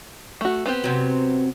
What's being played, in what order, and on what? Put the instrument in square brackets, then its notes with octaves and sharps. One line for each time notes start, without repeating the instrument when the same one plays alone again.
[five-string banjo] A3 F#4
B3 C4 G4
[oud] F#2 C3 F#3